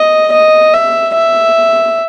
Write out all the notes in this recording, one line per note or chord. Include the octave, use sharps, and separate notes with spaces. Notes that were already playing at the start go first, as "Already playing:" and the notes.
Already playing: D#5
D#5
E5
E5